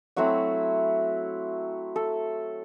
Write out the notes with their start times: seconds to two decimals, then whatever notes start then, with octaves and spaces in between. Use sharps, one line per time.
0.16 F#3 A3 C4 E4 F#4
1.96 A4